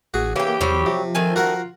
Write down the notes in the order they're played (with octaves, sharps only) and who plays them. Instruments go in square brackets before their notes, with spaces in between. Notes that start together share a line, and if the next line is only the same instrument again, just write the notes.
[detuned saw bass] A1 [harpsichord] F#4 [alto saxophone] G#4
[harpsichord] C#3 [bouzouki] E3 G5 [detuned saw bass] A#3 [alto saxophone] G4
[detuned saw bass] E2 [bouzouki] F#3 G3 [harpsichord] C5
[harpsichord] C3 [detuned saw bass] F3
[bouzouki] D#3 A3 C4 [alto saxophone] G#5
[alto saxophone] F4 [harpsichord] F#4 A#4 F#5